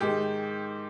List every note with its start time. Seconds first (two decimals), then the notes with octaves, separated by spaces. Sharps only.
0.01 G#2 D#3 G4